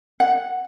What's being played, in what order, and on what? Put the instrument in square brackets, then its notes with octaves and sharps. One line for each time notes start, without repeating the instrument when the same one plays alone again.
[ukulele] F#5